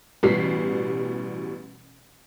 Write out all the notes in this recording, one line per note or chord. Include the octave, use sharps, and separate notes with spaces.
A1 B2 E3 G3 B6 C7